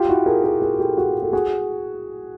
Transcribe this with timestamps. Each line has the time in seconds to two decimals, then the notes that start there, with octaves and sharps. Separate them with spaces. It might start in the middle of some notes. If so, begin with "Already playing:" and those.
Already playing: F4 G4
0.09 E4 F#4
0.26 G#4 A#4
0.44 G#4 A#4
0.62 G#4 A#4
0.79 G4 A4
0.97 F#4 G#4
1.22 A4
1.33 F#4 G#4